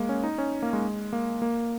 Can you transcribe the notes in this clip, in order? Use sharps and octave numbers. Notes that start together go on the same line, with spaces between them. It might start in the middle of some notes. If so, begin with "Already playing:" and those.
Already playing: G#3 A#3
C#4
D#4
C#4
A#3
G#3
A#3
A#3